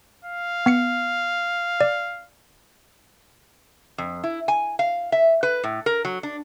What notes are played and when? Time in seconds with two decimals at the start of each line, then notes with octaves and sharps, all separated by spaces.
0.25 F5
0.66 B3 C7 C#7
1.81 D5
3.98 F2
4.23 E4
4.48 G#5
4.79 F5
5.12 E5
5.43 B4
5.64 A2
5.86 A#4
6.05 F#3
6.23 D4